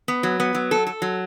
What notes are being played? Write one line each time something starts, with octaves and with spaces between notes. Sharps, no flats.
B3
F#3
B3
F#3
A4
A4
F#3